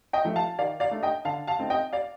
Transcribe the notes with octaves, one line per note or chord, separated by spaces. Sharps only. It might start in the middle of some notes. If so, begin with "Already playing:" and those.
D#5 G5
F3 A3
F5 A5
D#3 D5 F5
D5 F5
A3 D4
D#5 G5
D3 F5 A5
F5 A5
A3 C4 D#4
D#5 G5
D5 F5